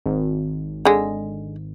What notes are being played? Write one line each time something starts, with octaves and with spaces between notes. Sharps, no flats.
G#1
D3 G#3